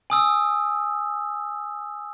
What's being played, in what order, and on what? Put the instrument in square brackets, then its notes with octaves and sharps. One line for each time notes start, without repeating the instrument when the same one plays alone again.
[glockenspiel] G#5 D#6 E6